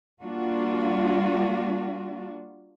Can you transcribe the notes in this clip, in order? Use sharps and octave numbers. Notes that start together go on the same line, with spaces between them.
G3 A#3 D4 F4 F#4